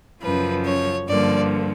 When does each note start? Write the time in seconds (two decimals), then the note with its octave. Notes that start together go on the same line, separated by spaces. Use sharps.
0.21 F#2 C#3 F3 B4
0.65 C#5
1.07 G2 D3 F3 A#3 D5